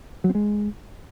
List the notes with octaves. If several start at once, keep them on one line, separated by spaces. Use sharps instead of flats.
F#3
C4
G#3